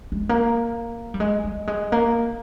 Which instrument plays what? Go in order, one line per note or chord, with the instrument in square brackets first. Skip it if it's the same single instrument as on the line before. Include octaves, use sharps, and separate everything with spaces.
[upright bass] G#3
A#3
G3
G#3
G3
G#3
A#3